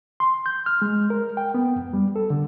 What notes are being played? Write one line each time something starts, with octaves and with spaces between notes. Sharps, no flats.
C6
G6
F6
G#3
A#4
G5
B3
F2
G3
A4
D3